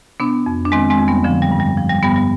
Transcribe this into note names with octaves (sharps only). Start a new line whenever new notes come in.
C3 B3 D4
F2
D4
D#3 G#3 C4
G#3 C4
F2
G3 B3
D3 F3
G3
G2
G3
F3
G3
G2 G3 B3
G3